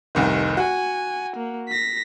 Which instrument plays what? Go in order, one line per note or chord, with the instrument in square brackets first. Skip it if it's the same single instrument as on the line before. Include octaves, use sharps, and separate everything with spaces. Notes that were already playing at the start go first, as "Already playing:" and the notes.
[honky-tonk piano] F1 C2 D#3
[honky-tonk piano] F#4 [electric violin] G#5
[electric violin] A#3
A#6 B6